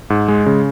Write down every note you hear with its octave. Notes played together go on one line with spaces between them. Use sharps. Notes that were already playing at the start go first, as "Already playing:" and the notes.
G#2
G#3
C#3